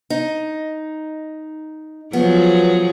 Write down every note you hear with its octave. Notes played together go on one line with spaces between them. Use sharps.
D#4
F3 F#3 B3 G#4